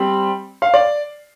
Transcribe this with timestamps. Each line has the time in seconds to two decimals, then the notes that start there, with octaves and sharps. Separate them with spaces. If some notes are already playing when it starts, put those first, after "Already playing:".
Already playing: G3 C4
0.62 F5
0.74 D5